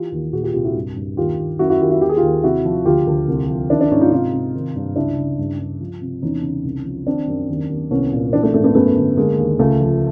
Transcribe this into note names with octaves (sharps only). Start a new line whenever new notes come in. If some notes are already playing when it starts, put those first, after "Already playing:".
Already playing: E3 F4 G4
D#2
A#2 F#4 G#4
F4 G4
C2 F4 G4
E4 F#4
G2
G2
D#2 F4 G4
D#2
F#2 E4 F#4
E4 F#4
D#3 F4 G4
E4 F#4
D#2 G4
G#4
F4 G4
D#2
C3 E4 F#4
F3
D2 F4 G4
D2
C2
F3
D#3 D4 E4
D4 E4
G#2 C#4 D#4
D#4 F4
C3 D#4 F4
C3
D#3
G2
C#2 D4 E4
C#3
G2
G2
F3
C3
E2 C#4 D#4
C#3
C2
F3
D#3 C4 D4
F#2
D#2
D#2
C2 B3 C#4
A#2
E3 C4 D4
A3
G#2 A3
A3 B3
F#2 A3 B3
D3
D3 G#3 A#3
D#2
C#2 A3
F3